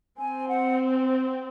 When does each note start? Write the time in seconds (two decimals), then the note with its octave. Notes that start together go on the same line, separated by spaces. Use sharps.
0.18 C4 G#5
0.49 F#5